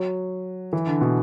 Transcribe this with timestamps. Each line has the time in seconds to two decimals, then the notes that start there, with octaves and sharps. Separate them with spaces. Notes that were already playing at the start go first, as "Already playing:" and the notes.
Already playing: F#3
0.73 E3
0.87 D3
1.01 B2